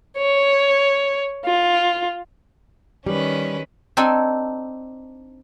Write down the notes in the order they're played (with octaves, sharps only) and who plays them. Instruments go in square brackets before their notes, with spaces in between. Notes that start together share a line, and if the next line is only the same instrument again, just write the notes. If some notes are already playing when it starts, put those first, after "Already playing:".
[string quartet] C#5
F4
[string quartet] D#3 C#4 B4 [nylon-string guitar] G3
[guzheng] C4 D4 D#4 A4 G#5